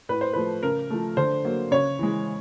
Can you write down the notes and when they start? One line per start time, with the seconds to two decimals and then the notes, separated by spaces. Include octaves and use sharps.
0.09 A2 B4
0.21 C5
0.33 F3 A3 B4
0.63 C#3 A#4
0.90 F3 A3
1.17 D3 C5
1.45 F#3 A#3
1.71 C#3 C#5
1.99 E3 G#3